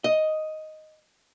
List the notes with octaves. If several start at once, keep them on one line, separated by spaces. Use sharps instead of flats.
D#5